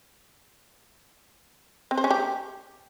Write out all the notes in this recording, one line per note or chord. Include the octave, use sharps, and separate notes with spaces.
C4
C5
C#4
G4